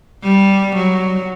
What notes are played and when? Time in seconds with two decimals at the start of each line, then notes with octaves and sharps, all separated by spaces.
0.23 G3
0.75 F#3